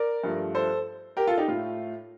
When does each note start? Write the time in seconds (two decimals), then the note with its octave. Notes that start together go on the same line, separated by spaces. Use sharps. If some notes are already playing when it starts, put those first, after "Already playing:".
Already playing: A#4 D5
0.24 G2 F3 A3
0.55 A4 C5
1.17 G4 A#4
1.27 F4 A4
1.38 D#4 G4
1.48 A2 A3 F4